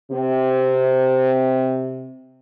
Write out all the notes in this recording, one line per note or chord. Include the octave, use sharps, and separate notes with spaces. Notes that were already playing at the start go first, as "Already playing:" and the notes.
C3 C4